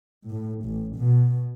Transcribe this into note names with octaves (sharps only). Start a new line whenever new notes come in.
A2
A1
B2